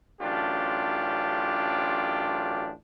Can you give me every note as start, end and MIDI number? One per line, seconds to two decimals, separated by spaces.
0.21 2.70 33
0.21 2.70 42
0.21 2.70 62
0.21 2.70 65
0.21 2.70 67